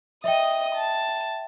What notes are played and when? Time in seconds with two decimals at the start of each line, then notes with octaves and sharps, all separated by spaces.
0.24 D#5 E5 G5 D#6
0.75 A5